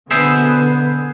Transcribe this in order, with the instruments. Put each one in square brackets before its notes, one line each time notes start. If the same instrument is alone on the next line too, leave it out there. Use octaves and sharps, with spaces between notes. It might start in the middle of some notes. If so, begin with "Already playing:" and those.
[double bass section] B2 D3 B3 [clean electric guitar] G#4 C5 E5